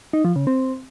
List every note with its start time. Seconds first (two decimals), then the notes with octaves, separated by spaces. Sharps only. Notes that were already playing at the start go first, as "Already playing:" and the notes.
0.13 D#4
0.25 F3
0.36 C#3
0.47 C4